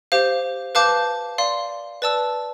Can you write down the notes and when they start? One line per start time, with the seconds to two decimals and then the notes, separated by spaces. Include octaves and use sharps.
0.12 G4 C5 F5
0.75 B4 F5 A5 D6 G6
1.38 D5 F5 C6
2.02 B4 D5 A5 E6